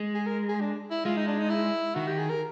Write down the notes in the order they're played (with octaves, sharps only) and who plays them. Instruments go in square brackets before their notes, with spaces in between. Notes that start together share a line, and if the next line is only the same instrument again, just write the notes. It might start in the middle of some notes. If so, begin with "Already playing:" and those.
Already playing: [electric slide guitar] G#3
[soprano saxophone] G#4
A#4
G#4
D4
E4
[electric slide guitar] G#3 [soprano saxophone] F4
[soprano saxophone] D#4
D4
D#4
E4
[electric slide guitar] D#3 [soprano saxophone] F#4
[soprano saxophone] G4
G#4
A#4